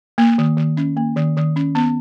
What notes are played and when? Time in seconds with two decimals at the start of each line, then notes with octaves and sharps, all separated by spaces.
0.18 A#3
0.38 D#3
0.57 D#3
0.77 C#4
0.97 A#3
1.16 D#3
1.37 D#3
1.56 C#4
1.75 B3